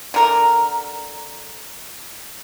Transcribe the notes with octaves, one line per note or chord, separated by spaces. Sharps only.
D3 A#4